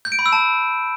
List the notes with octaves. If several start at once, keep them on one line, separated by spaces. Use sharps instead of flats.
G6
D7
B5
E6
A5